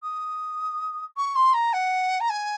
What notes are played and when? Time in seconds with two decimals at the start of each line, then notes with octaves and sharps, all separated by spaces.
0.03 D#6
1.17 C#6
1.35 C6
1.54 A#5
1.73 F#5
2.20 A#5
2.29 G#5